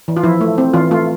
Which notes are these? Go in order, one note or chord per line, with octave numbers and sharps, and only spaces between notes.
E3
F4
F3 E4
A3
C4
E3 F4
A3 F4